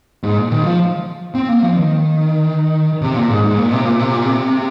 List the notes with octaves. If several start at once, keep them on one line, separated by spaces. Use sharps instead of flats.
G#2
A#2
D#3
G#3
F3
C4
A#3
F3
D#3
C3
A#2
G#2
G#2
A#2
C3
A#2
C3
A#2
C3